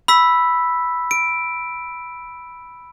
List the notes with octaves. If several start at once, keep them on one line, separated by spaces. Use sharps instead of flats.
B5 E6 B6
D7